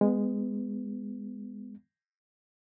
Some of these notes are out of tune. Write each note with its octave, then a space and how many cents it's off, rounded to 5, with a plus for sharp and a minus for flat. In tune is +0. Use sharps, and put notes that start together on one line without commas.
G#3 -15 B3 +20